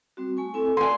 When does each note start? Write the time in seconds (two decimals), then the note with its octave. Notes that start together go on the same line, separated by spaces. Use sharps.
0.17 G3 C4 F#4
0.37 A3 G#5 C#6
0.54 C4 E4 A4 G#5
0.77 A3 D5 G#5 A5 C6